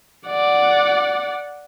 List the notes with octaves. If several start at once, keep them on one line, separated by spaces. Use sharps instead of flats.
D5 F#5